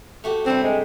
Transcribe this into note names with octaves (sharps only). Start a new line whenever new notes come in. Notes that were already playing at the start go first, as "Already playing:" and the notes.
A3 F#4 G4
G2 C3 G3 C4
G#3